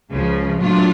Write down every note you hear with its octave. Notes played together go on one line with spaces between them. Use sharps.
C#2 C#3 F3
A#2 F#3 A3 D4 F4